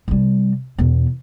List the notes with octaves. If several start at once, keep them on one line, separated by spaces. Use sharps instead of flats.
C3 G3
E2 B2